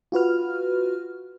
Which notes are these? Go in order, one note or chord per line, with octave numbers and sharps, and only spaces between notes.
F4 F#4 B4 F6